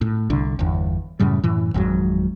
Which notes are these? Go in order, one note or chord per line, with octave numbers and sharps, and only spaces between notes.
A2
C2 D3
G1 E2
F#2 A2 C#3 G3
F#2 A2 E3
G#1 F2 G#2 F#3